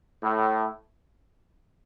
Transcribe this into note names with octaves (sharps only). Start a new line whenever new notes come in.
A2